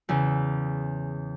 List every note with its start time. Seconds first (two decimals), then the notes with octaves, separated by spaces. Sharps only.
0.09 E2 C#3 C#4